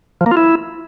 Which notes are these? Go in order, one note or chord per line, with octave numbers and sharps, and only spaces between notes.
F3
A#3
F4
E4